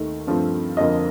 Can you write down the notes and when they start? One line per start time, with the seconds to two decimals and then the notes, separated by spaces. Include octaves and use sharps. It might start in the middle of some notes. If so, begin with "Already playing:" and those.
Already playing: D#2 D#3 A3
0.27 G2 F3 A3 C4
0.77 F2 D3 F3 A#3 D#5